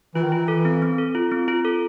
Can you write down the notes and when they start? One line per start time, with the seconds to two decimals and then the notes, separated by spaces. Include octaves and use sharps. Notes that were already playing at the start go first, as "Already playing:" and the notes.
0.15 E3 F4
0.23 D#3
0.32 E3 F4
0.48 A4
0.65 C4
0.82 C4
0.98 A4
1.15 F4
1.31 C4
1.48 F4
1.65 A4